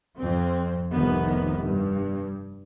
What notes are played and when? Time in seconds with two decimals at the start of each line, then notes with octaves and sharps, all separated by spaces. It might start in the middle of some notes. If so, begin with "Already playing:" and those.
0.17 F2 C4
0.91 F1 C2 D#3 B3
1.64 G2